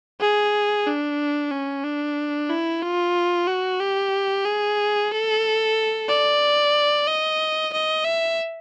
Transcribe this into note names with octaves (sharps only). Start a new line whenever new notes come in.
G#4
D4
C#4
D4
E4
F4
F#4
G4
G#4
A4
D5
D#5
D#5
E5